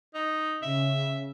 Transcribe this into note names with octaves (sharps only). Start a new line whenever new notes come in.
D#4
C#3 E5